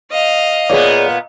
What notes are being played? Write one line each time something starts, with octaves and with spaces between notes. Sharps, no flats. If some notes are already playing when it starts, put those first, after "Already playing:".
D#5 F5
A#2 B3 G#4 C#5 D5